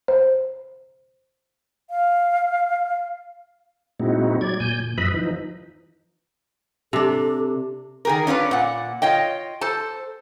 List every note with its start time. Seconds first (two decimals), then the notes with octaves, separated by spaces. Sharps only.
0.08 C5
1.90 F5
4.00 A#2 G#3 C4 D#4 E4 F#4
4.41 F#3 D5 G#6
4.60 A#2 G#5 G6
4.80 A#2
4.98 F#2 F3 B4 D#5 E5 B5
5.14 E3 F3 D#4
6.93 C3 D4 A4
8.05 D#3 G#4 A#4
8.27 C#4 D4 F4 B4
8.51 A#2 F#5
9.02 F4 C#5 D#5 G5
9.61 A4 C5 A5